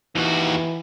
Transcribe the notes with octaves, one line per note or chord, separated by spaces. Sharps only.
D#2 E3 F#4